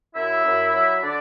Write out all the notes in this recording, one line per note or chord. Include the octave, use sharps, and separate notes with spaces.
F#2 E4 E5
F#2
F#3
D3 D4 D5